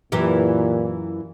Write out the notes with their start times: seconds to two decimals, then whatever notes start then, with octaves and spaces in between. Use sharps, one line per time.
0.12 F#2 A#2 E3 G4